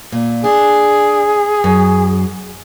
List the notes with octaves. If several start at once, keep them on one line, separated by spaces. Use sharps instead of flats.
A#2
D4 G#4
F#2